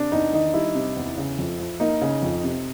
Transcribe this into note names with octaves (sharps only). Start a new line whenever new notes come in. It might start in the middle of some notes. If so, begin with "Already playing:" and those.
Already playing: C3 D4
E2 D#4
D#3 D#4
G3 E4
C3
E2
C#3
F2
F3
A#3 D#4
C#3
F2
C3